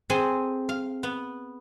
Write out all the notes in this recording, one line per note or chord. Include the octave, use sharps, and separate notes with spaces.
C4 G#4 A4 C5 G#5
F5
B3